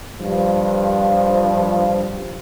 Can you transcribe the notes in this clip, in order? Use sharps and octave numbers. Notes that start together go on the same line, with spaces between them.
G2 F3